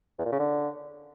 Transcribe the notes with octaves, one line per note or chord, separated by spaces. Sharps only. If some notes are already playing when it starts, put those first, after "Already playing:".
E2
A#2
C#3
D3